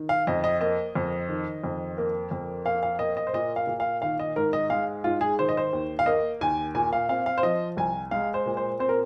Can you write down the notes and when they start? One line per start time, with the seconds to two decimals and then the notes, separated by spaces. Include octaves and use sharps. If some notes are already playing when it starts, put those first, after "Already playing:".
Already playing: D#3
0.09 F5
0.27 F2 D#5
0.44 D#5
0.61 A#3 D#5
0.95 F2
1.29 D#3
1.64 F2
1.98 A#3
2.31 F2
2.65 A#3 F5
2.83 F5
2.99 A#3 D#5
3.17 D#5
3.27 C5
3.33 A#2 D#5
3.56 F5
3.67 A#2
3.80 F5
4.02 D#3 F5
4.19 D#5
4.36 G#2 A#4
4.53 D#5
4.70 G#3 F5
5.04 G#2 F4
5.21 G#4
5.39 D#3 C5
5.49 D#5
5.57 C5
5.73 D#2
5.99 F5
6.06 A#3 D#5
6.41 D#2 G#5
6.75 A#2 G#5
6.93 F5
7.09 C4 F5
7.26 F5
7.38 C5
7.43 F3 D#5
7.77 C2 G#5
8.11 G#3 F5
8.34 C5
8.46 A#2
8.57 C5
8.79 C4 C5
8.89 A#4